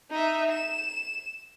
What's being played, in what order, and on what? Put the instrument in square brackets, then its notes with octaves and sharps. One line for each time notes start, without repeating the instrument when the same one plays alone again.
[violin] D#4 E5
E7